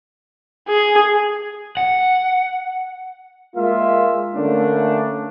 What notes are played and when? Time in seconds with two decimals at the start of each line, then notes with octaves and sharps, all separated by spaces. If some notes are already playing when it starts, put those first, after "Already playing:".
0.69 G#4
1.77 F#5
3.56 G#3 A#3 F4 E5
4.35 D3 A3 A#3 C#4 D4